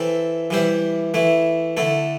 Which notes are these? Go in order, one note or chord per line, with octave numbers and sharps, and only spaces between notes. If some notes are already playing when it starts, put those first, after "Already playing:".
Already playing: E3 C4 A4 E5
E3 G3 E4 C5 E5
E3 A3 E4
D3 A3 E4 A4